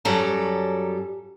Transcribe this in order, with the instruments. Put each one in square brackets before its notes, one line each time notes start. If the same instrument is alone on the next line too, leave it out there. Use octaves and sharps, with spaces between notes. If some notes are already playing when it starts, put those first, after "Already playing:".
[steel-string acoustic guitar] F#2 F#3 G3 A4 A#5